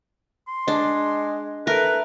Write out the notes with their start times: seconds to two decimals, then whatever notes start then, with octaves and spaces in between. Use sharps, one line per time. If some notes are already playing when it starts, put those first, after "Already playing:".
0.48 C6
0.68 G#3 D4
1.67 A3 A#4 B4